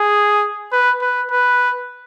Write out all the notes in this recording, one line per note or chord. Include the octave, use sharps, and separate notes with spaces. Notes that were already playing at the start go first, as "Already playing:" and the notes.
Already playing: G#4
B4
B4
B4